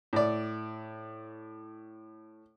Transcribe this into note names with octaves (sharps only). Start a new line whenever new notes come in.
A2 D5